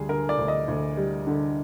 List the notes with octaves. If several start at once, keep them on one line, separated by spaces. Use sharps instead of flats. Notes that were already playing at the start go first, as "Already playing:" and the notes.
Already playing: D2 G3 G#4
D3 A#4
D5
D2
D#5
D2
G3
D3